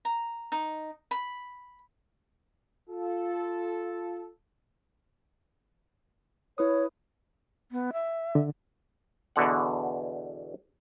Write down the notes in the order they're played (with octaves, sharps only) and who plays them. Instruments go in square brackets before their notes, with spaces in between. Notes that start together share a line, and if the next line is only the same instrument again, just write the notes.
[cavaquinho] A#5
D#4
B5
[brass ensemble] F4 A4
[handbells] E4 B4 D#6 [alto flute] C#5
[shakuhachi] B3
E5
[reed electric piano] D3
[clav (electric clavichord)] E2 B2 D3 F#5